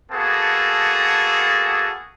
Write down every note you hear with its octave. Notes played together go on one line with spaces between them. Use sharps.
A#3 B3 F#4 G#4 A4 A5